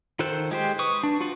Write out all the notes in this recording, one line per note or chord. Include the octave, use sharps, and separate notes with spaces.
D#3 F4 A4 C5 F#6
G#3 G4 C5
B4 C#6 D#6
D4
F4 F#4 B4